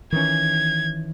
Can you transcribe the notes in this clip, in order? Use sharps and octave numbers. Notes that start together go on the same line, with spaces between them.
D#3 E3 C#4 G#6